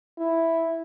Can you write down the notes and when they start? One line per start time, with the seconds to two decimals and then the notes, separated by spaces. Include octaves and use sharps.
0.18 E4